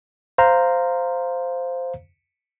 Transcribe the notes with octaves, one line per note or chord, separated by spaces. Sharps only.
C5 F5 A#5